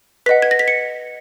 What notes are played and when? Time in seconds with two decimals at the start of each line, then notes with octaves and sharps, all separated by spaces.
0.26 B4 D#5 F#5 B6
0.42 G#6
0.51 A#6
0.59 B6
0.68 C#7